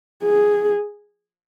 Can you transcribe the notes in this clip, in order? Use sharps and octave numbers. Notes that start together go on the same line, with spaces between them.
G#4